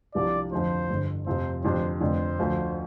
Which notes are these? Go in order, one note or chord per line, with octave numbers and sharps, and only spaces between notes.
C2 C3 F3 D4 G4 D5
F2 D3 F3 C5
G1 G2 D3
F2 C3 F3 C4 C5
F1 F2 D3 G3 D4 C5
F1 F2 D3 C5
D2 D3 F3